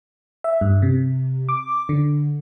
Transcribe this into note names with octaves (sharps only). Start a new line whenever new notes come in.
E5
G2
C3
D6
D3